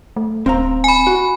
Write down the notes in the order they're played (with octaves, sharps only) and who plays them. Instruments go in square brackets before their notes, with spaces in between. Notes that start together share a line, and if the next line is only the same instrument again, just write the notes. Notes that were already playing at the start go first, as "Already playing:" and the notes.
[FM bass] A3
[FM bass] D1 [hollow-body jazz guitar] C4 F5 A#5
[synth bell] G#5 B5
[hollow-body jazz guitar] F#4